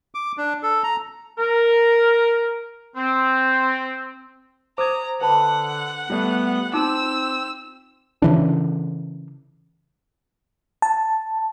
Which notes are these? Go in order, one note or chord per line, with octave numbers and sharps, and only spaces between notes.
D6
D4
A4
A#5
A#4
C4
C5 A#5 D6 D#6 G#6
D3 B4 F#5 A5 B5
G3 A3 B3 F4 D5
C4 D#4 F4 C6 D6 E6
C#3 E3 D4
A5